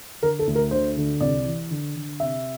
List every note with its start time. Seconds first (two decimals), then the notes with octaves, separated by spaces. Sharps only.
0.22 D3 A#4
0.39 A4
0.47 D2
0.55 A#4
0.71 D3 C5
0.97 D3
1.20 C2 D5
1.45 E3
1.71 D3
1.95 D3
2.20 C3 E5